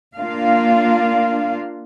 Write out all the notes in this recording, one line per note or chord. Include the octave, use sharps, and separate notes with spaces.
A#3 D4 F4 F5